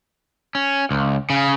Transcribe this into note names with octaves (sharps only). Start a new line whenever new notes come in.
C#4
C#2
C#3